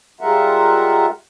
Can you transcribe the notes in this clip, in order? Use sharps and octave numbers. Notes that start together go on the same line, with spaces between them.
G3 G#3 F4 A#4 E5 F#5